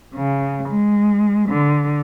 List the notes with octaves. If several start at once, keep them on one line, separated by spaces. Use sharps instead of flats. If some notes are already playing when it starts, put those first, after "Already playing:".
C#3
G#3
D3